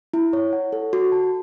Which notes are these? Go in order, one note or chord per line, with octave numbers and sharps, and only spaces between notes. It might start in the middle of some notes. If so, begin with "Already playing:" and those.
E4
C#5
F#5
A4
F#4
A5